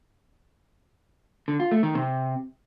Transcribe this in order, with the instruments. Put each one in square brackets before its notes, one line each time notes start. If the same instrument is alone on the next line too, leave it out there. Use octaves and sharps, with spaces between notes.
[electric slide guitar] D3
F4
A3
D#3
C3